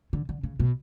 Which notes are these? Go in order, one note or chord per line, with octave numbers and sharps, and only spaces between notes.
D3
D3
C#3
B2